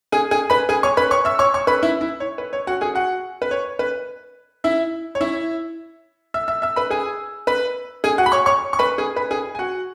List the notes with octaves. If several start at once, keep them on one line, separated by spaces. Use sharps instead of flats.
G#4 G#5
G#4 G#5
B4 B5
G#4 G#5
C#5 C#6
B4 B5
C#5 C#6
E5 E6
C#5 C#6
C#5 C#6
B4 B5
E4 E5
E4 E5
C#5
B4
C#5
F#4 F#5
G#4 G#5
F#4 F#5
B4
C#5
B4
E4 E5
C#5
E4 E5
E5 E6
E5 E6
E5 E6
B4 B5
G#4 G#5
B4 B5
G#4 G#5
F#4 F#5
B5
C#5 C#6
C#5 C#6
C#6
B4 B5
G#4 G#5
B4 B5
G#4 G#5
G#5
F#4 F#5